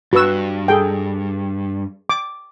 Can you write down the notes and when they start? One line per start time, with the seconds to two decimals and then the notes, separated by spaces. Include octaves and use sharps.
0.13 G2 F#4 B4 E6
0.68 G#4 A4 G5
2.09 D6